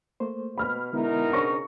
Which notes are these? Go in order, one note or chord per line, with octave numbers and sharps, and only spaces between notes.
A3 A#3 C5
B2 B5 F6
B2 D3 G#3 B3 D#4 E4 A#4
C#3 D4 C5 C#5 C#6 A#6